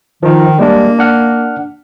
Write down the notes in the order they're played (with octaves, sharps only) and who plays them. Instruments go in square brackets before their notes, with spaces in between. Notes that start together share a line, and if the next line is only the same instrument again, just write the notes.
[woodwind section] D#3 [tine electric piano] F3 D#4
[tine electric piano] G3 G#3 D4 [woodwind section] A#3
[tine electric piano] D4 F#5 F6